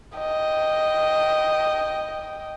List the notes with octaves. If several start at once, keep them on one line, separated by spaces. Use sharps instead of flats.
D#5 G5